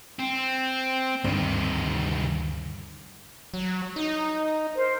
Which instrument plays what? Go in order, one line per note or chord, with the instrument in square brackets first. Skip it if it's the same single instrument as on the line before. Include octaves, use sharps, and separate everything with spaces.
[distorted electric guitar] C4
[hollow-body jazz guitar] D2 G2 [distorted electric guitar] C3 D#3
[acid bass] F#3
D#4
[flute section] A#4 C5